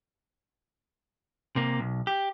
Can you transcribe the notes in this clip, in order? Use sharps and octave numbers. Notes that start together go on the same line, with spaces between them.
C3 A#3
B1
G4